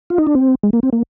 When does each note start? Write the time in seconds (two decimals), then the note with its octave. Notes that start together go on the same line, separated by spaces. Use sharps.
0.10 F4
0.18 D#4
0.27 D4
0.35 C4
0.63 G#3
0.73 A#3
0.83 C4
0.93 A#3